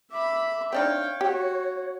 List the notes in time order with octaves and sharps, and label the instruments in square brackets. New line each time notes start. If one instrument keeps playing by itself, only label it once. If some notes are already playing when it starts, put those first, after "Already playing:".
[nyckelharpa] E5 B5 [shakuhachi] D6
[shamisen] C4 D4 D#4 [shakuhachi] C#5 [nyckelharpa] F5 G5
[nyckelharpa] F#4 [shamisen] G4